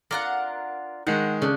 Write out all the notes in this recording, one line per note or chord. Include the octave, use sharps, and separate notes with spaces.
D4 F4 A#4 F#5
D#3 G#3 F#5
C#3 D4